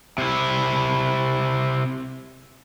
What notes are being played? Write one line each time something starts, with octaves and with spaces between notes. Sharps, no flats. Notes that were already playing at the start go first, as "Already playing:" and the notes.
C3 E4